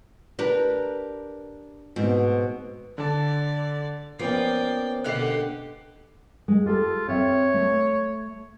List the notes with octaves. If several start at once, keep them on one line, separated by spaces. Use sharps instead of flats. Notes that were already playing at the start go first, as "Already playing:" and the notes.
D4 G4 A#4 B4
G#2 B2 C4
D3 D5 A5
F3 A#3 B3 C#4 D5 G5 C7
B2 D3 G4 F5 F#5 F#6 C7
G#3
F4 G4 A4
C4 C#5 E5
A3